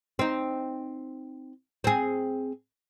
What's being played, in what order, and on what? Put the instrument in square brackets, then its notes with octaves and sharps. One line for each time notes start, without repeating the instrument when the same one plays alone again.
[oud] C4 D#4
C4 G#4